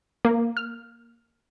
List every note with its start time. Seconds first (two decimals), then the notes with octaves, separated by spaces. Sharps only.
0.25 A#3
0.57 F6